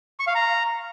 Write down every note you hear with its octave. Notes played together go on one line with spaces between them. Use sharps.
C#6
F5
A#5